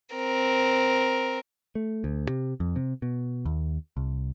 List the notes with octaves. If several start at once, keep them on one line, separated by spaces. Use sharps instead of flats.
C4 A#4
A3
D2
C3
F2
C3
B2
D#2
C2